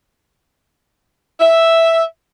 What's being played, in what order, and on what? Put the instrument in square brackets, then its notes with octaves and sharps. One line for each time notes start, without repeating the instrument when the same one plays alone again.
[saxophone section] E5